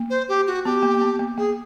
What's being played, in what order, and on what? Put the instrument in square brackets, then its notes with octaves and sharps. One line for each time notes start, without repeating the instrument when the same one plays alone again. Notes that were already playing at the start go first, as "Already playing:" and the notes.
Already playing: [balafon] A#3
[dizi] C5
G4
F#4
[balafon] B3 [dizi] G4
[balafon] A#3
A#3
B3
A#3
[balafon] A#3 [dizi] G#4